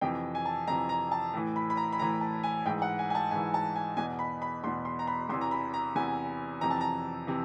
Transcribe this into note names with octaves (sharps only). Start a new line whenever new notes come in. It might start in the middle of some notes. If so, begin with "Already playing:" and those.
F2 C3 E3 G5
G#5
A5
F2 C3 E3 A#5
A#5
A5
A2 E3
B5
B5
A#5
B5
A2 E3 A#5
A5
G#5
G#2 E3 G5
F#5
G#5
G#5
A5
G#2 E3 G#5
A5
G#5
E2 B2 G#5
B5
B5
E2 B2 C6
C6
A#5
B5
E2 C3 E3 C6
A#5
B5
A#5
E2 C3 E3 G#5
F2 C3 E3 A#5
A5
A#5
C3 E3